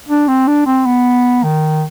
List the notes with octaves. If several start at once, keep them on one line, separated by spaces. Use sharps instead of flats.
D4
C4
D4
C4
B3
D#3